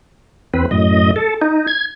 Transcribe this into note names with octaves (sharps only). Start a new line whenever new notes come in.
E2 C4 B4
F#2 A2 D#5
A4
D#4
G#6